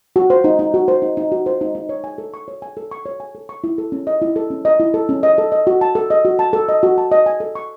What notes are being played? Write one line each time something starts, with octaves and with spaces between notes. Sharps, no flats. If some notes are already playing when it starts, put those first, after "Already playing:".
F#4
C5
D#4
D#4
F#4
C5
D#4
D#4
F#4
C5
D#4
D#4
C#5
G#5
A4
C#6
C#5
G#5
A4
C#6
C#5
G#5
A4
C#6
E4
A4
C#4
D#5
E4
A4
C#4
D#5
E4
A4
C#4
D#5
A4
D#5
F#4
A5
A4
D#5
F#4
A5
A4
D#5
F#4
A5
D#5
G#5
A4
C#6